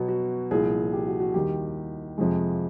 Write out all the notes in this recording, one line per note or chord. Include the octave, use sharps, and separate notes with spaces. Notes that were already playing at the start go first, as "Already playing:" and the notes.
Already playing: B2 F#3 B3
F#4
C2 A#2 F3 G#4
G4
F#4
F#4
D#2 D#3 G3 G4
F2 C3 F3 G#3